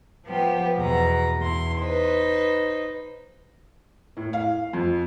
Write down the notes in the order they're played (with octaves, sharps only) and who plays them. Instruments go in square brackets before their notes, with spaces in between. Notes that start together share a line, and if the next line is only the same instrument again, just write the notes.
[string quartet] F3 B3 G4
E2 B2 B4 A#5
E2 E4 C6
D#4 B4 C5
[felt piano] A2
F5
F2